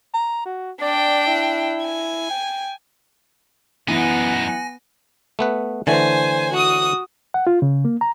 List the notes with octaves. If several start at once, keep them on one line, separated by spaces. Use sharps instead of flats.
A#5
F#4
D4 D5 G5
E4
G#5
G5
F#2 E3 B3 D#4 F#5 G#5 A#6
A3 B3 B4
D3 E3 A3 C5 G#5
F#4 D#6
F#5
F4
C#3
A#3
A#5